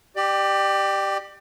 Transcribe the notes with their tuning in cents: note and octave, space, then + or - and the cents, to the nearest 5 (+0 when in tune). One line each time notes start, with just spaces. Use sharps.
G4 +0 D5 +30